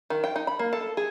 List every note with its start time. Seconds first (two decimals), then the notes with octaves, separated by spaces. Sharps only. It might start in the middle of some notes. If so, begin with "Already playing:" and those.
0.10 D#3
0.24 G5
0.36 D#4
0.47 B5
0.59 A#3
0.73 A4
0.97 G#4